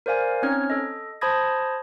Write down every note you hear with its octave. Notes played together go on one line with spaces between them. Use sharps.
A#4 C5 D5 F5 G#5
C4 C#4 D#4 C#5 F6 G#6
A4 D#5
C5 A5 B5 D#6 G#6 A#6